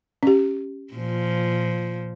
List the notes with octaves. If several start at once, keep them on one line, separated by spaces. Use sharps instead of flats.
C#4 G4
A#2 F3